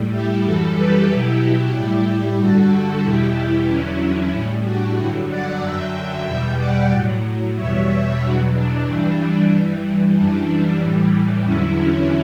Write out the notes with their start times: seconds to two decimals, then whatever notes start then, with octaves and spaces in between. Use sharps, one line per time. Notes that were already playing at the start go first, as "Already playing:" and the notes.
Already playing: A2 G3
0.11 E4 G4
0.44 F#2 E3 G3 F#4 A4
0.76 G4 B4
1.08 B2 F#3 E4 G4
1.73 A2 G3 E4 G4
2.37 G2 D3 G3 F#4 A4
3.02 E2 B2 G3 E4 G4
3.67 E2 D3 F#3 C#4 E4
4.32 A2 G3 C#4 E4
4.64 D4 F#4
4.97 G2 D3 F#3 E4 G4
5.29 D5 F#5
5.61 F#2 D3 F#3 E5 G5
6.26 E2 B2 G3 E5 G5
6.58 D5 F#5
6.91 A2 F#3
7.55 E2 B2 G3 C#5 E5
8.20 E2 B2 F#3 D4 F#4
8.53 D4
8.85 G2 E3 G3
9.50 G2 E3 G3
10.15 F#2 E3 G3 D4
10.79 A2 E3 G3
11.44 E2 D3 F#3 C#4 E4
11.76 C#4